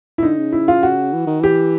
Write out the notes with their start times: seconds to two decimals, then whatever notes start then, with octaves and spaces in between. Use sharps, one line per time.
0.18 E4
0.23 D3 D#4
0.38 C#3
0.52 E4
0.68 F4
0.83 F#4
1.13 E3
1.27 D#3
1.41 E3 G4